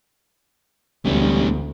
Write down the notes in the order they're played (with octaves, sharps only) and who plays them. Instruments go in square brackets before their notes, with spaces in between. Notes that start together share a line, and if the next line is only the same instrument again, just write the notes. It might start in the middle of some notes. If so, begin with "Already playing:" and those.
[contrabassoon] E1 [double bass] D2 [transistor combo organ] G3 [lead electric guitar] A3 C#4